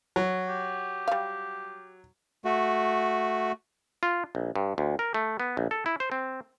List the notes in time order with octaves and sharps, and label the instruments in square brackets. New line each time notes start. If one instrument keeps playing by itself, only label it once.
[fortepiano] F#3
[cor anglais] G4
[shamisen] G3 F5
[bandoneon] A3 F#4
[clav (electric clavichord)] F4
A#1
G2
D2
A#4
A3
B3
A#1
A4
E4
C5
C4